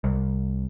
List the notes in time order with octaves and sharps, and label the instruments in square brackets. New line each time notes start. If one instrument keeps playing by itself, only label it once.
[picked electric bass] C2